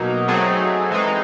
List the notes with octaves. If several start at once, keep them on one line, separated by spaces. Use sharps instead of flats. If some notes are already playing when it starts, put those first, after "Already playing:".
Already playing: B2 F#3 A#3 D#4
F#3 A3 C4 D#4 G#4
E3 G#3 C4 D#4